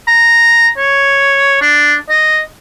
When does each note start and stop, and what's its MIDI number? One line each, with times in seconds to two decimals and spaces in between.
0.07 0.70 82
0.78 1.60 73
1.62 1.94 62
2.09 2.41 75